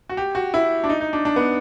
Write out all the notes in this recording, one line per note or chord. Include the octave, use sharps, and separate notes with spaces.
F#4
G4
F#4
E4
D4
D#4
D#4
D4
D4
B3